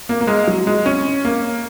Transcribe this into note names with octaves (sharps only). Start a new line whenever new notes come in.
A#3
A#3
G#3
F#3
G#3
C#4
A#3